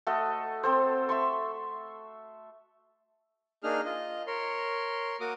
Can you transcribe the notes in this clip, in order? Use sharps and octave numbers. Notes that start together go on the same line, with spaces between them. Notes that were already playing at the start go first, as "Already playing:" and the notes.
A3 F#4 A4 D#5
C4 A4 C5
E5 C6 C#6
A#3 D4 D#4 G#4 F6
F4 D#5
A#4 C#5 C6
A#3 F#4 A#4 D6 D#6